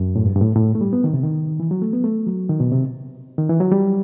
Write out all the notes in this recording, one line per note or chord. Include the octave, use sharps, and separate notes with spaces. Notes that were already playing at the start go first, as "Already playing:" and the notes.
Already playing: F#2
A2
G2
G2
A2
A2
A3
G3
B3
D#3
C3
D#3
E3
F#3
A3
B3
A3
F#3
D#3
B2
C3
D#3
E3
F#3
G3